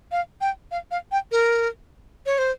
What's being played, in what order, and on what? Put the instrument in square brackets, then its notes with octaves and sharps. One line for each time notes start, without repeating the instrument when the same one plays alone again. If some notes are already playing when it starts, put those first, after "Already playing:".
[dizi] F5
G5
F5
F5
G5
A#4
C#5
C5